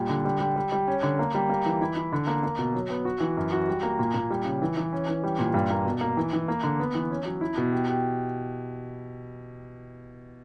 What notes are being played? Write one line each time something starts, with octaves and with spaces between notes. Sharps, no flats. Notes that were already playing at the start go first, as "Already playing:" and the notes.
Already playing: A#2 G3
D3
G3
G3
G3
G3
C#4
D3
A#3
G3
A#3
E3
E4
E4
D3
A#3
A#3
B2
F#3
B3
F#4
E3
F#2
F#4
G3
A#3
A#2
A#2
G3
C#3
E3
E3
C#4
E3
G3
A#2
G2
A#3
B2
A#3
E3
E3
A#3
D3
B3
E3
C#4
F#3
E4
B2
G4
G4